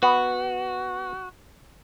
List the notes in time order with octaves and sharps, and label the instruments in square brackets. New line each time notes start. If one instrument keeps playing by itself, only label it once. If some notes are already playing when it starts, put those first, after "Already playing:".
[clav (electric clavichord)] B3 [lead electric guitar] F#4